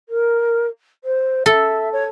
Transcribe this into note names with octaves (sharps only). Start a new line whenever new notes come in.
A#4
C5
A4 E5
C#5